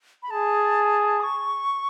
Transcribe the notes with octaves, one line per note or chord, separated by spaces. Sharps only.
B5
G#4 A5
D#6
C#6